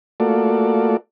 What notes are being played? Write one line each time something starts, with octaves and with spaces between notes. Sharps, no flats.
A3 A#3 F4 F#4 A4 D5